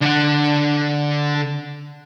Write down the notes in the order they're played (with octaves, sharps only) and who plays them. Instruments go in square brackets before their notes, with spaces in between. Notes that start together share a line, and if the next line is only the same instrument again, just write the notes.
[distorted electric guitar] D3 F#5